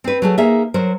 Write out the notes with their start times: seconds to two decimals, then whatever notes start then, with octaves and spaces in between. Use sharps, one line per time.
0.04 C4 B4
0.22 F#3 A3 G#4
0.38 A#3 D#4 G#4 E5
0.74 F#3 A#4 C5